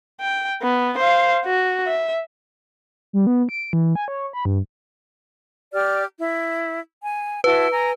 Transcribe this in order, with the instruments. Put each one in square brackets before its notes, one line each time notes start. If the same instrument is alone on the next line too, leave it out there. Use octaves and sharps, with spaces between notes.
[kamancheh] G5
B3
C5 F5
F#4
E5
[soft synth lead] G3
B3
D7
E3
G#5
C#5
B5
G2
[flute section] G4 D5 F6
E4
G#5
[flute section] E4 F#4 A5 [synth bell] B4
[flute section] G#5 A#5